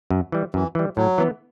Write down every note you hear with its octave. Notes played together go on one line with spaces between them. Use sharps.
F#2
E3 G3
F#2 E3
E3 G3
A2 F#3
E3 B3